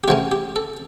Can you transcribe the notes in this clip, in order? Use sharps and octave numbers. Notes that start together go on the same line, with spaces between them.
G4
C#2 C3 E3 A3 C#4 F#4
G4
A4